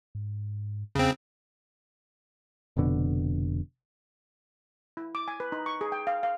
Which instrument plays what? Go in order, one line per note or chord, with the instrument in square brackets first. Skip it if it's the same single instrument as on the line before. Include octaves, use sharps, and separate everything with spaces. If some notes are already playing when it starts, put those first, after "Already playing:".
[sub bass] G#2
[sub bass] E2 [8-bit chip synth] C#3 C4
[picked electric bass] F1 F2 B2 D3
[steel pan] E4
D6
G#5
B4
D#4
C#6
G#4
G5
F5
F5